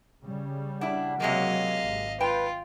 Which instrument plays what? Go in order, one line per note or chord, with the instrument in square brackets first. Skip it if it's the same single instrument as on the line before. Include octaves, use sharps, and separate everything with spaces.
[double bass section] C#3 G3
[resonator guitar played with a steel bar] D4 E4 [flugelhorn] F#5
[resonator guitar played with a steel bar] C3 G#3 A#3 [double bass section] F#3 [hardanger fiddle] D#5 F5
[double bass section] G#1
[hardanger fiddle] F4 [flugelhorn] B4 [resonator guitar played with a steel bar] G5